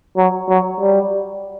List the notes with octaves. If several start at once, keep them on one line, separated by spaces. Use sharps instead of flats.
F#3
F#3
G3